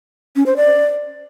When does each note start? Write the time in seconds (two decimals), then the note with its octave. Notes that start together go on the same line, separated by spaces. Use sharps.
0.36 C#4
0.46 C5
0.57 D5